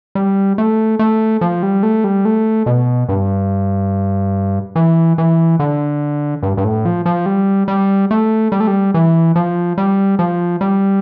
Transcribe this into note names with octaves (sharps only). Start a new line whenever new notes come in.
G3
A3
A3
F3
G3
A3
G3
A3
B2
G2
E3
E3
D3
G2
G2
A2
F3
F3
G3
G3
A3
G3
A3
G3
E3
F3
G3
F3
G3